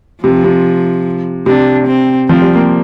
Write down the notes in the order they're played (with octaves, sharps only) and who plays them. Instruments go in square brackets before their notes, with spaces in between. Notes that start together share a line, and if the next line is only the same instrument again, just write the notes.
[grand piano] C3 [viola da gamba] F3
[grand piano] C3
[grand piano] C3 [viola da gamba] D4
[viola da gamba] C4
[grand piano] F3 [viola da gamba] C4
[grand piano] G3
A#3